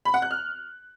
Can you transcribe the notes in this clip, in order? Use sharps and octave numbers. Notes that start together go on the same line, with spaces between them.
B5
F#5
F#6
F6